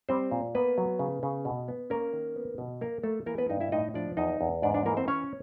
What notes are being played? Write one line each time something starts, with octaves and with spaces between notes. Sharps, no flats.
G3 C4 C5
A#2
A#3 B3 B4
F#3
C#3
C#3
B2
B3
A#3 C#4 A#4
D#3
B3
B2
A#3 A#4
A3 A#3 A4
E3 A#3 A#4
B3 B4
G2 D#4 D#5
E4 E5
A2 D#4 D#5
F3 D4 D5
E2 D#4 D#5
E2
G#2 D4 D5
D4 D5
E3 A#3 A#4
C4 C5
C#4 C#5